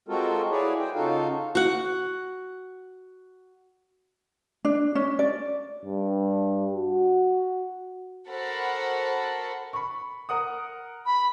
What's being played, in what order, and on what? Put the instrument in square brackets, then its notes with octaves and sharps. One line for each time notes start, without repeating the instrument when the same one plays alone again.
[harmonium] G#3 C4 F4 F#4 A4 A#4
E4 F#4 G#4 B4 C#5 D5
C5 G5
C#3 D#4 F4 F#4 A4 F5
[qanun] F#4 F#5
[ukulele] D4
C#4
D5
[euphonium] G2
F#4
[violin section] F#4 A4 A#4 C5 F#5 B5
[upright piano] B5 C#6
A#4 F#5 D#6
[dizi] B5